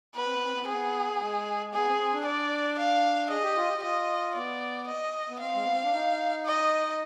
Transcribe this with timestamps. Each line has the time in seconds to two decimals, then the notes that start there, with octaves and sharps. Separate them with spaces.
0.16 B3 B4
0.25 C4
0.34 B3
0.44 C4
0.53 B3
0.61 C4
0.68 B3 G#4
1.13 B3
1.21 G#3
1.73 B3 G#4
1.87 C4
2.00 C4
2.13 D4
2.26 D5
2.78 F5
3.30 G#4 D#5
3.43 G4
3.57 F4
3.68 G4
3.78 G4
3.83 F4 D#5
4.36 B3 D5
4.88 D#5
5.29 B3
5.40 C4 F5
5.55 G#3
5.64 B3
5.73 C4
5.83 D4
5.93 D#4
6.46 D#5